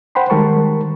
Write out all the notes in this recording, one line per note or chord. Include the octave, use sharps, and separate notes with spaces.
C5 F#5 G5 B5 C6
D#3 G3 G#3 A#4 A5 C#6